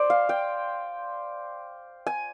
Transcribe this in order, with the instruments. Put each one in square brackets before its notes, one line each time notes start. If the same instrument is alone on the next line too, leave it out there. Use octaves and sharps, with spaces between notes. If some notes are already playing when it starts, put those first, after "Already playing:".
Already playing: [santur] C5 D5
F5
G5
G#5